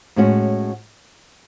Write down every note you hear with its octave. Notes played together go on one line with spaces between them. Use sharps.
A2 G#3 C#4 F#4